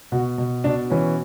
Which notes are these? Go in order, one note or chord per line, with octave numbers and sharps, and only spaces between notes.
B2 F#4
B2
B2 D4
E3 C#4